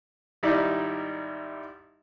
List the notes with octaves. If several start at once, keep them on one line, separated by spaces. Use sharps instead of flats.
G#1 G3 D#4 E4 D5 E5